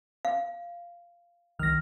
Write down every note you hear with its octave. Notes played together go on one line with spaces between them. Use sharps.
F5
C2 D#3 F6 A#6